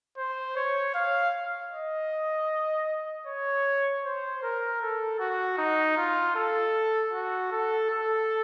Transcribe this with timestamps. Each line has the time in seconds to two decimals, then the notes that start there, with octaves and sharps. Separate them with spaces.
0.18 C5
0.56 C#5
0.95 F5
1.72 D#5
3.27 C#5
4.04 C5
4.43 A#4
4.81 A4
5.20 F#4
5.58 D#4
5.97 F4
6.36 A4
7.13 F#4
7.52 A4
7.90 A4